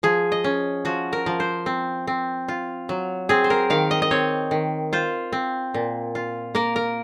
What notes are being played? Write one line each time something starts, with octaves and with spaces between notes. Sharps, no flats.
F3 G#4
D#5
C#4
F3 F#4
A#4
F3
C5
C4
C4
F4
F#3
C4 G#4
C5
A#4
D#3 F5
D#5
D#5
C4 C#5
D#3
F4 C5
C4
A#2
F4
A#3 A#4
A#4